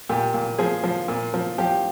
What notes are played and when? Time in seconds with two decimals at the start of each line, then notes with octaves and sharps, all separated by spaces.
0.09 A#2 G4
0.34 A#2
0.58 F3 G#4
0.83 F3
1.08 A#2
1.34 F3
1.58 F3 G4